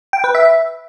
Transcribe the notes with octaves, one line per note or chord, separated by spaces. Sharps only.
G5
B4
E5